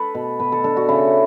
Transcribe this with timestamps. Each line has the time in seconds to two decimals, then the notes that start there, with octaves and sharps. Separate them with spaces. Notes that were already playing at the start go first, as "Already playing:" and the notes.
Already playing: A4 B4
0.15 B2
0.39 B2 B4
0.52 A4
0.64 D4 A4
0.77 F#4
0.89 C#3 E4